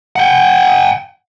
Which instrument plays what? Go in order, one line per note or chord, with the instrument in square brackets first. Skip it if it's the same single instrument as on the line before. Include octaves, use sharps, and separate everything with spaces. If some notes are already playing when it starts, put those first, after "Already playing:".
[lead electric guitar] F#5 G5